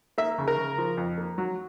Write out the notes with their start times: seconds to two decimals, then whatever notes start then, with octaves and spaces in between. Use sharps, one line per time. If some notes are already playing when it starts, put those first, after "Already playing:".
0.18 A#3 E5
0.38 C#3
0.48 A#4
0.58 C#3
0.78 F3
0.97 F2
1.18 A#3
1.38 F#3